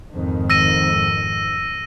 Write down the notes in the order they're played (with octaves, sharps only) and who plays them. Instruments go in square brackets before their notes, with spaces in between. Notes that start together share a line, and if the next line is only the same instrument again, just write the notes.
[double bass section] F2 G#2 D#3
[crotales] E6 A#6 D#7